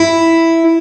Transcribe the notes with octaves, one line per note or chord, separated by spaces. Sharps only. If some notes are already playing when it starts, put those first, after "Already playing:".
Already playing: E4